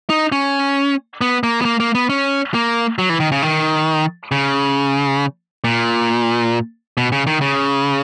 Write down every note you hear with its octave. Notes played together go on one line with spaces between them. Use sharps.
D#4
C#4
B3
A#3
B3
A#3
A#3
B3
C#4
A#3
F#3
E3
D#3
C#3
D#3
C#3
A#2
B2
C#3
D#3
C#3